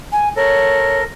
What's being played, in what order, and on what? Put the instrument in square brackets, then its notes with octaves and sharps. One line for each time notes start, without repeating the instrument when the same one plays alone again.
[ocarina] G#5
[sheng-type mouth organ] A4 A#4 [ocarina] C#5